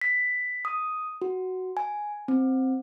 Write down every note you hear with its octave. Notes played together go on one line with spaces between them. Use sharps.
B6
D#6
F#4
G#5
C4